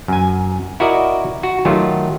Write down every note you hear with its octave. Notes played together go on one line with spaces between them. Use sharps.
F#2 G#5
E4 F#4 A#4 D5 D#5
F#4
D#3 F#3 A3 F4 G4